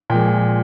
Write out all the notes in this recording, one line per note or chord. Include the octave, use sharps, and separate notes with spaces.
A#2 F3 G#3 G5